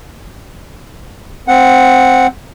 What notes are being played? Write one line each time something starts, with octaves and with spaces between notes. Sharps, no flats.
C4 F#5